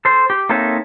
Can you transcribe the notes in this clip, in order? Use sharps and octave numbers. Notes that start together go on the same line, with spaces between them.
A4 C5
G4
A#3 C4 D#4 A4 C#5 E5